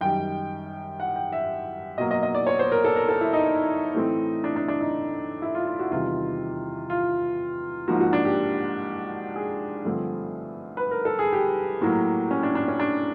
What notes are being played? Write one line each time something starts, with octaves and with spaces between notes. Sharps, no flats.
F#2 D#3 G3 G5
F#5
G5
E5
B2 F#3 A#3 D#5
D#5
D#5
D5
C#5
C5
A#4
A4
A#4
A4
E4
D#4
A2 E3 A3 C4
D4
D4
D4
D#4
E4
F4
F4
F#4
E2 C3 D#3 G3 F4
F4
G#2 F3 A#3 F#4
F#4
D4
G4
G#4
G2 D3 F3 A3 C4
B4
A#4
A4
G#4
G4
A2 F#3 A#3
C#4
D4
D4
C#4
D4